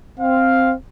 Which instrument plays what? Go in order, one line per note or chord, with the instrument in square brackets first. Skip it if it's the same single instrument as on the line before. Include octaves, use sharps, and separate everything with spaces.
[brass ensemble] C4 F5